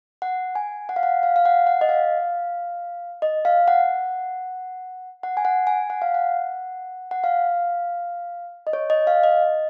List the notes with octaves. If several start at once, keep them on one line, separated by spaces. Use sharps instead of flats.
F#5
G#5
F#5
F5
F#5
F5
F5
F#5
F#5
D#5
F5
D#5
F5
F#5
F#5
G#5
F#5
G#5
F#5
F5
F#5
F#5
F5
D#5
C#5
D#5
F5
D#5